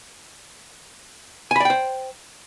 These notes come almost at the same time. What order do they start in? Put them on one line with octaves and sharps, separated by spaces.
G#5 B5 D5 G5 C5